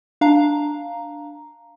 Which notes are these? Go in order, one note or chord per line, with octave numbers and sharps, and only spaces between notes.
D4 F5 A#5